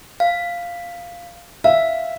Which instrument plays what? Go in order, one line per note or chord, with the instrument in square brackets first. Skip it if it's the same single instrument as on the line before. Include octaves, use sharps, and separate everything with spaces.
[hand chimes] F5
[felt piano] E5 [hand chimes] F5